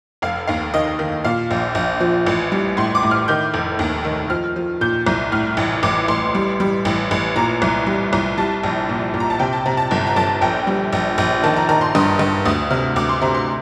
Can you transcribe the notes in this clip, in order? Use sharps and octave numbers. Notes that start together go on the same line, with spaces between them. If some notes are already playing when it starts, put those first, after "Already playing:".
F1 F5
D#2 F5
D#3 D#5
D#3
A#2 F5
A#1
A#1
F3
A1
G3
A2 C6
D6
A2
F6
D#3 G6
F1
D#2
D#3
F3 F6
F3
A#2 G6
C2
A2 F6
A1
A1 D6
A1 C6
G3
G3
A1
A1
A#2 A#5
C2
G3
C2
G3 A5
A#1
A#2
A#2
A#5
A5
C3 G5
A5
C3 A#5
A5
G1
A#5
G1 A5
A#1 G5
G3
A#1
A#1
D#3 A5
A#5
D#3 A#5
C6
G2 D#6
G2
D2 D#6
C3 F6
D2 D6
C6
C3 A#5
C6